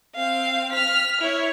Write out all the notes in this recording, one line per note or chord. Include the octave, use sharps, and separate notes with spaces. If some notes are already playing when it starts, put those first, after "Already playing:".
C4 F5
F6 B6
E4 C#5